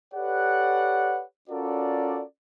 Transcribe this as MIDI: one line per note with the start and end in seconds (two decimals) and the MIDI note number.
0.14 1.23 67
0.14 1.23 69
0.14 1.23 71
0.14 1.23 73
0.14 1.23 74
0.14 1.23 78
1.50 2.23 61
1.50 2.23 65
1.50 2.23 66
1.50 2.23 69
1.50 2.23 70
1.50 2.23 74